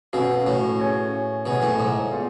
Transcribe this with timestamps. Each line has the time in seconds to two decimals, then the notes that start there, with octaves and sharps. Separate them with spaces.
0.13 B2 C#4 F#4 A4 F5
0.47 A2
0.80 C#4 G#4 C#5
1.46 B2 G#4 C#5 G#5
1.62 A2
1.79 G#2
2.12 B3 F4 G#4 D5 F5